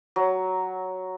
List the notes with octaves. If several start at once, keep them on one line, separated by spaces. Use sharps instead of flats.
F#3